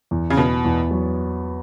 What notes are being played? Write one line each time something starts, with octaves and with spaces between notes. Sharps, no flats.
E2
C#3
B2 B3
E2
F#3